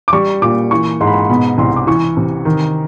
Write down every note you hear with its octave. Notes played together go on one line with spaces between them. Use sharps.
D6
G3 C#6
A#2 D6
E3 C#6
G#2 C6
B5
C6
B2 B5
C2 C6
D6
E3 C#6
C3
D#3